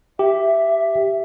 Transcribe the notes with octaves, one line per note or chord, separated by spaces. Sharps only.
G4 E5